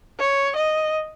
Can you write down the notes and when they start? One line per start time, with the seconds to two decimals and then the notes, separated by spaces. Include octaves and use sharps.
0.19 C#5
0.56 D#5